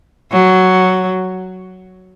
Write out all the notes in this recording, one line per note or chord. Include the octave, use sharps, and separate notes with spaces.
F#3